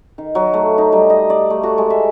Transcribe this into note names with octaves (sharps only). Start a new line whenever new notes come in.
D#3
F#3
A3
D#4
G3
D#5
D5
A3
F#4
G#3
E5